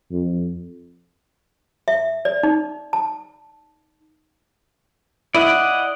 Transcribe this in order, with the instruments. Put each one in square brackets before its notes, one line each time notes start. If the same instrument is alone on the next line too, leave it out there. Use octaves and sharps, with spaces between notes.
[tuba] F2
[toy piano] E5
D5
D#4
A5
[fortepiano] E4 [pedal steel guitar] D5 D#5 F#5